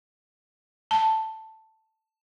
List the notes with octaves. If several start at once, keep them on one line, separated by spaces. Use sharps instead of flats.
A5